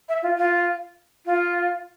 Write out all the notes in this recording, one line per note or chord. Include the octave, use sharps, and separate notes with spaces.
E5
F4
F4
F4